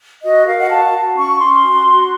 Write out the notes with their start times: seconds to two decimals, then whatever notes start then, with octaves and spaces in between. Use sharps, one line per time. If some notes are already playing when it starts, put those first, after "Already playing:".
0.22 F#4 D#5
0.46 A#4 F5
0.59 F#5
0.69 F#4 A5
0.93 F#4
1.16 C#4 C#6
1.39 C#4 C6
1.63 F#4
1.86 F#4